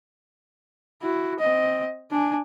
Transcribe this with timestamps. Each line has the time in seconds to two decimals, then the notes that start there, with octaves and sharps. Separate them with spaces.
1.03 E4 F#4
1.40 C4 D#5
2.11 D4 G#5